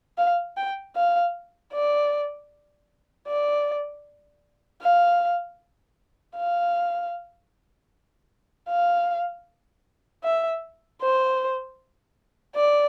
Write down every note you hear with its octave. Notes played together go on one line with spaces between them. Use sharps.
F5
G5
F5
D5
D5
F5
F5
F5
E5
C5
D5